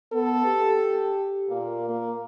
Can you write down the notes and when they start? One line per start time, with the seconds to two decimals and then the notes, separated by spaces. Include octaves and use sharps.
0.13 B3 A4
0.45 G4
1.50 A#2 A#3
1.90 A#3